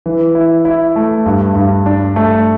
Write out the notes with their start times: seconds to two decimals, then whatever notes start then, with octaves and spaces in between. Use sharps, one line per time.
0.06 E3
0.35 E4
0.65 E4
0.96 A3
1.26 G2
1.55 G2
1.86 D4
2.16 A3